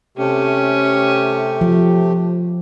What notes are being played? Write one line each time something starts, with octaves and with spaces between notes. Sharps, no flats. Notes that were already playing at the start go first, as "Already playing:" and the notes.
C3 A3 C#4 G4
F3